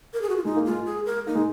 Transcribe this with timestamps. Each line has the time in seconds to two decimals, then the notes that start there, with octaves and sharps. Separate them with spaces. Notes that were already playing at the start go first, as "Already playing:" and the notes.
0.13 A#4
0.22 G#4
0.29 F#4
0.37 F4
0.45 G#3 D#4
0.56 A#3
0.66 G#3 F4
0.86 G#4
1.06 A#4
1.27 A#3 D#4
1.35 G#3